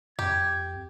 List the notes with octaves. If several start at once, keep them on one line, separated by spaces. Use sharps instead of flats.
F2 G4 G#6